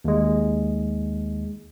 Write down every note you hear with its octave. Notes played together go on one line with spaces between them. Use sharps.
D#2 G#3